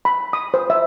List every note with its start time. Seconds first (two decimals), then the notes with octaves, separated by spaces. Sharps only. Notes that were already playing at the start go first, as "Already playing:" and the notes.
0.05 B5
0.33 D#6
0.54 C5
0.70 E5